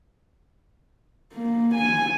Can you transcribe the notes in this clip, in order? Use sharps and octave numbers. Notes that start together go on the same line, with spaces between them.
A#3
G#5